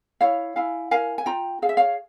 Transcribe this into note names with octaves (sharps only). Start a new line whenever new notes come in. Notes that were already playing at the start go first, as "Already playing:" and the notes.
E4 C#5 F5
E4 F5 G#5
A#4 F5 G#5
G#5
F4 G5 A#5
G#4 F5
E5
C#5 F5